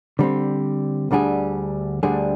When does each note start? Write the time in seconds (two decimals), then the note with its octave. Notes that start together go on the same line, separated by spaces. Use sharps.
0.19 D3 G3 C4
1.11 D2 D3 G3 D4 G#4
2.03 D2 D3 G3 D4 G#4